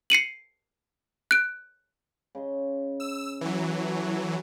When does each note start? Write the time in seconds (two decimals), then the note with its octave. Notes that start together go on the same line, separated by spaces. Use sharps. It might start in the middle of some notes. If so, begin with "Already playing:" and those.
0.10 C7 C#7 D#7 F#7
1.31 F#6 D7
2.35 C#3 D#5 C6
3.00 E6
3.41 E3 F#3
3.70 F#4 A4